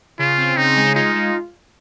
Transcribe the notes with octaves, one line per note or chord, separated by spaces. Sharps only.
C#3 F4
C4
C#3 D#4
G#3
D#4 F4
G#3